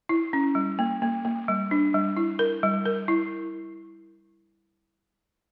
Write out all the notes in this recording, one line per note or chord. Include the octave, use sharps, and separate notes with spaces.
E4
C#4
G3
A#3
A#3
A#3
G3
D4
G3
E4
A#4
G3
A#4
E4